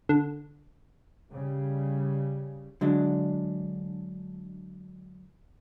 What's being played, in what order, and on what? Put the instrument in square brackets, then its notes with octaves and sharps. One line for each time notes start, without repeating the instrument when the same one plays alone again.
[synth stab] D3
[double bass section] C#3 G3
[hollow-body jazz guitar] D3 F#3 G#3 D4